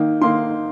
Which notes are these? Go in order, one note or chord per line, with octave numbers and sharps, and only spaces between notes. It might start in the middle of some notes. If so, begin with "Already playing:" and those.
Already playing: D#3 A#3 D#4
D#3 A#3 D#4 C6